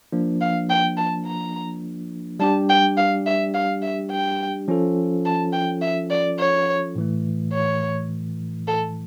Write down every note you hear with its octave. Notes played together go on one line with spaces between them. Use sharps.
F3 A#3 D4
F5
G5
A5
A#5
G3 D4 G4 A5
G5
F5
E5
F5
E5
G5
F3 C#4 F4 A4
A5
G5
E5
D5
C#5
A2 E3 A3
C#5
A4